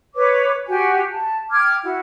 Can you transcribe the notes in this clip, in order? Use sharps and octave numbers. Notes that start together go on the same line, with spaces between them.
B4 C#5 D6
F#4 G4 G#5
A5
G5 D6 F6 G#6
E4 F#4